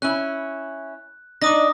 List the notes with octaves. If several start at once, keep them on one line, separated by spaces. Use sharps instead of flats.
C#4 E4 F#6
D4 D#4 D6 D#6 A#6